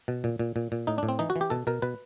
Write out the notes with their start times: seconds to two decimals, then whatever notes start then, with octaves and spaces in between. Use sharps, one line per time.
0.08 B2
0.24 A#2
0.39 A#2
0.56 A#2
0.72 A#2
0.87 A2 D#4
0.98 D4
1.03 A2
1.09 C4
1.19 E3 D#4
1.30 F#4
1.36 E3
1.41 G4
1.50 B2 A4
1.67 B2 A#4
1.82 B2 B4